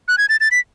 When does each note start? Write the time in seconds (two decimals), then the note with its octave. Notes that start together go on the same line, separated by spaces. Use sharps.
0.08 F#6
0.18 G#6
0.29 A6
0.41 A6
0.51 B6